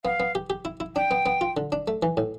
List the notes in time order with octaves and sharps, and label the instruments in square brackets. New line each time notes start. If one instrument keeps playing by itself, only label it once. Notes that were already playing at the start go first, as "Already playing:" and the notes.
[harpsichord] B3 [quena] F5
[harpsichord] B3
G4
G4
E4
E4
[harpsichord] D4 [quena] G5
[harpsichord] B3
B3
F4
D3
D4
A3
E3
A2